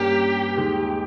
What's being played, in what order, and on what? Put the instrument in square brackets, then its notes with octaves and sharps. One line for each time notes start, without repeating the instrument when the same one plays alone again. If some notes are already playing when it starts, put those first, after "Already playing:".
Already playing: [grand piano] G2 G3 A#3 C#4 [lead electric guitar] G4
[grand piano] D#2 D#3 G#3 D#4